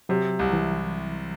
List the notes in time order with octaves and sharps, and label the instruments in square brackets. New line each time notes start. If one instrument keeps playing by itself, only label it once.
[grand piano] C3 [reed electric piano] F#3
[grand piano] C2
[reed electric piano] E3